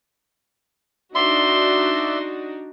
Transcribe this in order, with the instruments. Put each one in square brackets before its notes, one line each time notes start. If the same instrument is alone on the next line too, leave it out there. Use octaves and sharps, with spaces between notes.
[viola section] D4 D#4 F#4 [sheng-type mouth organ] D5 E5 [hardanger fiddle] C6